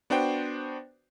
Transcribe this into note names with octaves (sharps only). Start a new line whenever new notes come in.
B3 D4 F#4 C5 G5